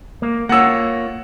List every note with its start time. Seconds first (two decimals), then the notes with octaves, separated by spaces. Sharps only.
0.22 A#3
0.49 A#3 F4 C#5 F#5 E6